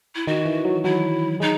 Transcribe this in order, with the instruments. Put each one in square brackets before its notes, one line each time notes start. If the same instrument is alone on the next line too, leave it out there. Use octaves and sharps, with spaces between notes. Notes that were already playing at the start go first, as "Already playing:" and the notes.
[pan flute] E4
[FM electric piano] D#3 [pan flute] F#4
[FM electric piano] E3
F#3
[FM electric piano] F#3 [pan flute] E4
[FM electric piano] G#3 [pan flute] D#4